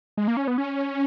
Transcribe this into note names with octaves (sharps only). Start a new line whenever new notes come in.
G#3
A#3
C#4
B3
C#4